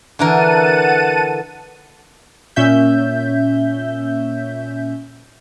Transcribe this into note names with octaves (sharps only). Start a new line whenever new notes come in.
D3 E3 A#4 F#5 A5 D#7
A#2 C#4 E5 G6